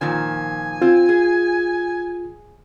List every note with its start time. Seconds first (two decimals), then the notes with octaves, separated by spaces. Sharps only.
0.01 A#2 D#3 F3 G#5
0.82 C4 F4
1.09 G#4